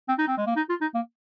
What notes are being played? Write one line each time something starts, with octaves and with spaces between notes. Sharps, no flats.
C4
D#4
C4
G#3
A#3
D#4
F4
D#4
A#3